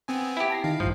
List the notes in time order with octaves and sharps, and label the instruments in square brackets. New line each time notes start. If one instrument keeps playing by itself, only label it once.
[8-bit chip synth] B3 C4 G#5
[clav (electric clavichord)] E4 G4
[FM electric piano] A5 A#6 C7
[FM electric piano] D#3 D#4 [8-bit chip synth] F5
[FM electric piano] A1 G2 [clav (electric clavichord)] F3